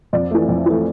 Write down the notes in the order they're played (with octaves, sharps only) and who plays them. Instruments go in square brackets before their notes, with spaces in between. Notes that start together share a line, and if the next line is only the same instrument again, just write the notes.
[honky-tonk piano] F2 D5
E3 A3
F2
E3 A3